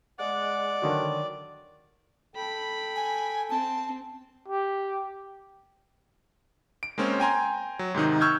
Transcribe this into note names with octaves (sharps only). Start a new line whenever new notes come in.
G#3 D5 F#5
D3 D#3 F#3
A4 G5 B5
G#5
C4 A5
G4
D7
G#3 A#3 C4 C#4
G5 G#5 A#5 C6
F#3
G#2 C3 D#3 D#4
C#6 E6 F6 G6 G#6